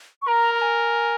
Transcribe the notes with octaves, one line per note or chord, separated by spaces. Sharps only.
C#6
A#4 A#5
A#5
G#5